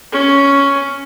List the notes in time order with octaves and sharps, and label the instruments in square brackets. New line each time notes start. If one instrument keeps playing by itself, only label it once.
[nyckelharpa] C#4